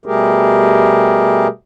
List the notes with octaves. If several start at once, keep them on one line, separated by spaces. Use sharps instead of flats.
B2 G3 A3 G4 G#4 A#4